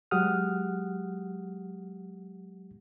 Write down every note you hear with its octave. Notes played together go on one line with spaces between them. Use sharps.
F#3 G#3 G4 F#5 D#6 F6